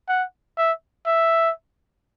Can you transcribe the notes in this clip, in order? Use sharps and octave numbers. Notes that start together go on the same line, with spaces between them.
F#5
E5
E5